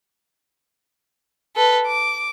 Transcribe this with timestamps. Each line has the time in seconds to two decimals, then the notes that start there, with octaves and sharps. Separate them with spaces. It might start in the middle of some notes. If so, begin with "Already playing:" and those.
1.56 A4 B4
1.87 D6